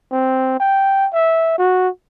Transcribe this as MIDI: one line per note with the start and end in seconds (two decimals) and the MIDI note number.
0.12 0.57 60
0.60 1.08 79
1.13 1.57 76
1.58 1.89 66